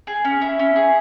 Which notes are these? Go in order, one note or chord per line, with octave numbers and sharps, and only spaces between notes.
G#4
C#4
E4
C#4
G#4